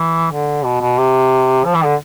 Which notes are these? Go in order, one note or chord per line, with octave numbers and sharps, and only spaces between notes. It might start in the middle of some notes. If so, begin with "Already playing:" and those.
Already playing: E3
D3
B2
B2
C3
F3
E3
D3